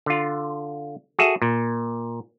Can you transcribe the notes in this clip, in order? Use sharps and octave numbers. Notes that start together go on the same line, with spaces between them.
D3 F4
F#4 G#4 A4 E5
A#2